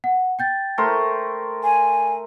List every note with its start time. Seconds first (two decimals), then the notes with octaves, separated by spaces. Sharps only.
0.04 F#5
0.39 G5 G6 A6
0.78 A3 A#4 C5
1.63 G#5